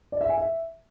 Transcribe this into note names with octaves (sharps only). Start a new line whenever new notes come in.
D5
E5
G#5
E5